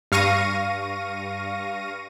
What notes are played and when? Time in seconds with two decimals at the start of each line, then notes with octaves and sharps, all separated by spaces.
0.12 G2 F5 C#6 A#6 D#7